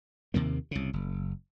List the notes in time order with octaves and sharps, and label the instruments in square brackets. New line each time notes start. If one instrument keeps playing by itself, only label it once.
[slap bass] D#2 C3 D#3 A#3
C2 C#3
F#1